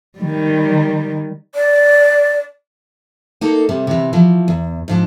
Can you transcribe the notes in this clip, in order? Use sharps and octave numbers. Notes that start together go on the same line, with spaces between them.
D#3 G3
D5
A#3 D#4 A4
C3 G3
C3 E3
E3 F3
E2
G#2 F3 D4